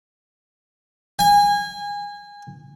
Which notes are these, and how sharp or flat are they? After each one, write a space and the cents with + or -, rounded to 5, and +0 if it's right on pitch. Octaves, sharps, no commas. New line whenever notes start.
G#5 -25